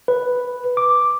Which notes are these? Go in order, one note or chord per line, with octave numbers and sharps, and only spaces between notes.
B4
D6